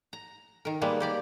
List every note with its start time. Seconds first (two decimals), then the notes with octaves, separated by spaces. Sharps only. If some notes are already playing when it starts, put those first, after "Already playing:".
0.13 A#5
0.65 D#3 A#4
0.81 G3 G#3 A#3 B3
1.00 A#3 G4 D5